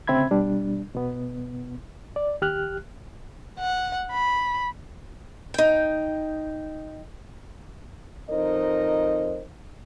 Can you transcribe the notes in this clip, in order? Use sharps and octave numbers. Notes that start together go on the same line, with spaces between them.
D2 C#3 C4 E5 B5 G#6
B2 G3 D4
B2 B3
D5
D#2 G4 F6 F#6
F#5
B5
D#4 G5
F2 D#4 A#4 C5 D#5